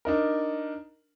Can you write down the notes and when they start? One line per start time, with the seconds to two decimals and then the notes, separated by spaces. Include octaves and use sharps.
0.05 D4 D#4 A#4